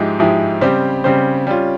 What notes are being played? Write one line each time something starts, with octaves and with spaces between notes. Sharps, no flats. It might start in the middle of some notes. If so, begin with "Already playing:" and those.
Already playing: G#2 F3 G#3 E4 G4
G#2 F3 G#3 E4 G4
C#3 G3 C4 G4 C5
C#3 G3 C4 G4 C5
G3 C#4 F4